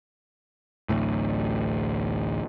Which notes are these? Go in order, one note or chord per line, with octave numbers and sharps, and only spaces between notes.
A1 D2 A2